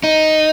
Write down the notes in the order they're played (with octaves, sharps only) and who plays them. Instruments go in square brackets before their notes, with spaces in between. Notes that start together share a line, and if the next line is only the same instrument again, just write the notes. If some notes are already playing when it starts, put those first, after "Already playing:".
[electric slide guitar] D#4